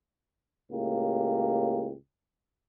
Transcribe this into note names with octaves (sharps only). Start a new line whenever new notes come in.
C#2 A2 A#3 G4